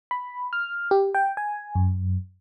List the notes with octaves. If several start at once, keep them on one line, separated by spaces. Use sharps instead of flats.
B5
F6
G4
G5
G#5
F#2